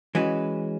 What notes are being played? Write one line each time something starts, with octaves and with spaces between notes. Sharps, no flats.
E3 G#3 C#4 F#4 B4